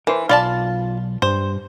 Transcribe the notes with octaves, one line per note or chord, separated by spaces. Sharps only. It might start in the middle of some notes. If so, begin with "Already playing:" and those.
E3 A#4 C5
B1 F4 D5 F5 A5 B5
G2 C5